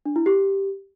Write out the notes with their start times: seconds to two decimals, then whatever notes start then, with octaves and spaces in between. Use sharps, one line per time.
0.06 D4
0.16 E4
0.26 G4